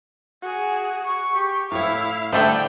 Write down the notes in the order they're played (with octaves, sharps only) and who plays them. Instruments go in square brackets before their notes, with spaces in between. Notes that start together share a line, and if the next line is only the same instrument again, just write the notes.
[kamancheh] F#4 G#4
[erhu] C#6
[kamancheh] G4
[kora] A2 C#5 [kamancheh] E4 [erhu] F5
[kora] D3 D4 C5 [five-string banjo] G3 A3 A4 [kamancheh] G5